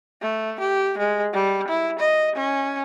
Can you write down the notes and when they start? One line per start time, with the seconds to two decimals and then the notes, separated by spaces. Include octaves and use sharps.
0.21 A3
0.60 G4
0.98 G#3
1.33 G3
1.68 E4
1.99 D#5
2.35 C#4